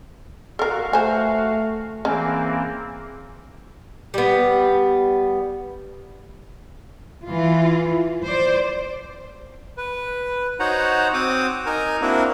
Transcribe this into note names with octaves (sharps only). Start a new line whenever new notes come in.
F#4 A4 A#4 F5
A3 C5 G#5
E3 A#3 C4 C#4 G#4
G3 B3
E3 F4
C5 D5
B4
D#4 F#4 C5 C#5 F#5 A#5
C4 F#4 C5 D6 D#6
D#4 A#4 G#5 A#5
A#3 C4 D4 E4 F#4 A#4